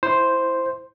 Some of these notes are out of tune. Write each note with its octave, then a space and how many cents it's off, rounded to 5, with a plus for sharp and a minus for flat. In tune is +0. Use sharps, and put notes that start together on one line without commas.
E4 +0 C5 +0